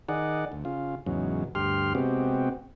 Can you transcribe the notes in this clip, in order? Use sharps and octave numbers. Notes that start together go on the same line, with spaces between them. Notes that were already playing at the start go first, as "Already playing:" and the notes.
D#3 D#4 G#4 D5 F#5
D2
C#3 F4
E2 G#2 C#3 F#3
D2 G2 G4 C6 F6
C3 G#3 B3 C4 F#4 G4